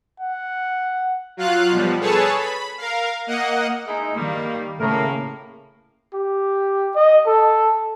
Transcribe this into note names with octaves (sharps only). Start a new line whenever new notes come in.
F#5
F#3 F4 F5 F#6
B2 F3 G3
G#4 A4 B4 C#5 A5
B5
A#4 F5
A#3 D#5 F#5
G#3 D#4 E4
D#3 G3 A#3
A2 C#3 A#3 A#4
G4
D#5
A4